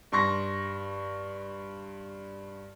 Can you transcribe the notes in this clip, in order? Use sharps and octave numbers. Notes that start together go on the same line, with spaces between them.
G2 C6 C#6 A#6